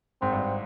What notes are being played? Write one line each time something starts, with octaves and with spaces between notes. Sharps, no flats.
G#1 G#2 C4
G2